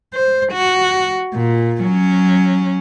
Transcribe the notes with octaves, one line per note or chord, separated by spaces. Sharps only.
C5
F#4
A#2
F#3 C#4